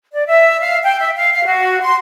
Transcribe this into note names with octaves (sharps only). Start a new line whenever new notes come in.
D5
E5
F5
G5
E5
F5
F5
F#4
C6